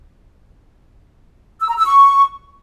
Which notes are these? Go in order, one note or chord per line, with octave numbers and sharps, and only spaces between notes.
E6
A#5
E6
C#6